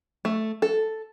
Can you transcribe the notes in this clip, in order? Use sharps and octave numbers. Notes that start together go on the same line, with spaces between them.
A3
A4